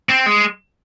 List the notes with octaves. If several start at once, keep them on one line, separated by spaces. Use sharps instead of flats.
C4
G#3